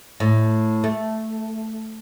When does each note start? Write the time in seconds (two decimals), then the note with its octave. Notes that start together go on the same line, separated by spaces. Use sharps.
0.20 A2
0.84 A3